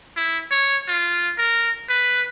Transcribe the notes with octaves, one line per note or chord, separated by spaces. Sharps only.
E4
C#5
F4
A#4
B4